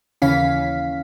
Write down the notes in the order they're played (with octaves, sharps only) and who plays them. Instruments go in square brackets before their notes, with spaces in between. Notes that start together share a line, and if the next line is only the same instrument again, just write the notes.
[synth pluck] D#2 C#3 E3 C#4 F5 B6